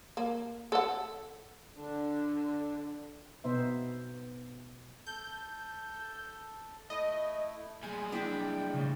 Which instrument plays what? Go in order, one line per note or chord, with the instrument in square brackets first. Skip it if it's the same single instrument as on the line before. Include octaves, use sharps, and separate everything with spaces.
[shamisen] A#3
A4 F#5
[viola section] D3 [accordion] D4
[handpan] B2 B3 D#4 C5 E5
[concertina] A4 [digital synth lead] G6
[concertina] A3 E4 [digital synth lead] D#5
[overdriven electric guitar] G3 G#3 [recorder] G#5
[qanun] D4 E4 D5 [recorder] G5
[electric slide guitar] A2 C#3